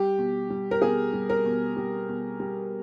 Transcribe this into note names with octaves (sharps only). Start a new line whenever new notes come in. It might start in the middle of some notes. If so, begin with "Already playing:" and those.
Already playing: G3 G4
B2
G3
A#4
B2 G#4
G3
A#4
B2
G3
B2
G3